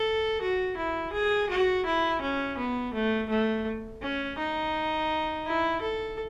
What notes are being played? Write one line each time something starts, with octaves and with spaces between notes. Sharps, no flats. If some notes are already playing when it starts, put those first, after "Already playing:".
Already playing: A4
F#4
E4
G#4
F#4
E4
C#4
B3
A3
A3
C#4
D#4
E4
A4